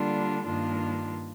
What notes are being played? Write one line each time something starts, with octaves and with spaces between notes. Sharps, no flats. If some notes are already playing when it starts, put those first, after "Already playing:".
Already playing: D3 G3 A#3 D4 F4
G2 D#3 A#3 D4 F4